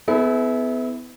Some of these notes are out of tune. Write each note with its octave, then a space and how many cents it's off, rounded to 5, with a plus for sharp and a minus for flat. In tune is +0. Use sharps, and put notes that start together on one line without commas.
B3 +25 E4 -20 G#4 +45